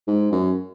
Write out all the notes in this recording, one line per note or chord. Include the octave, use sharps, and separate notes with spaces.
G#2
F#2